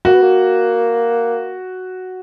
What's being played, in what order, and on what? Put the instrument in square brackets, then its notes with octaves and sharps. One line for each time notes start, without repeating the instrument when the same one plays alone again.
[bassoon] A#3 [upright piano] F#4
[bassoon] B3
A#3